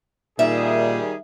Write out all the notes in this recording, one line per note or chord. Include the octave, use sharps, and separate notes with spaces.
A#2 D#3 G3 G#4 E5